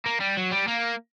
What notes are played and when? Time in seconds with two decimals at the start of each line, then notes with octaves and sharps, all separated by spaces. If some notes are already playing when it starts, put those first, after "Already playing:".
0.06 A#3
0.20 G3
0.37 F#3
0.51 G3
0.67 A#3